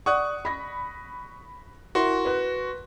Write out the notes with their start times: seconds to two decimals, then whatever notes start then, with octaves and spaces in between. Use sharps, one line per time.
0.06 D5 F#5 C#6 D#6 F#6
0.45 B5 A#6
1.95 E4 F#4 A#4 C6
2.25 B4 F#6